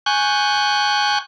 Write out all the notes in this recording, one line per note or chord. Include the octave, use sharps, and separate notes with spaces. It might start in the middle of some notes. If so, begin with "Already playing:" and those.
G#5 C#6 F#6 G6